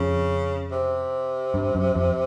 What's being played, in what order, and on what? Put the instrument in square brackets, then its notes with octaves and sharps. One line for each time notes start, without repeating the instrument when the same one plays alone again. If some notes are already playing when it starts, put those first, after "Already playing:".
Already playing: [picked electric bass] F2 [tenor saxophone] C#3
[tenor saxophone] C3
[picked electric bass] G2
F#2
F2